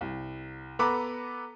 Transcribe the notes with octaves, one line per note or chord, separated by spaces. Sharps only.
C2
B3 A4 B4 A#5 B5 D6